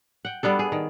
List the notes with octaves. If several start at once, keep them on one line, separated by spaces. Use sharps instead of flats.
F#5 G5
G3 B3 D4 A4
G#4
D#3